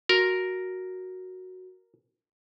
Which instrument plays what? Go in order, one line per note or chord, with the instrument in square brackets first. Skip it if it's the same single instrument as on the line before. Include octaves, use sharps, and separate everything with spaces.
[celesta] F#4 [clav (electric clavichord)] A#4